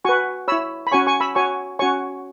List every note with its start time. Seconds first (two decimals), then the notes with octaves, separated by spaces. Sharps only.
0.05 F#4 B4 G#5 C#6
0.48 E4 C#5 B5 E6
0.87 B5
0.92 C#4 F#4 C#5 G#5 C#6
1.07 G#5 C#6
1.20 B5 E6
1.35 F#4 C#5 G#5 C#6
1.79 C#4 F#4 C#5 G#5 C#6